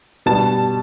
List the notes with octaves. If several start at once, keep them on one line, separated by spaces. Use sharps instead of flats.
B2 G3 A5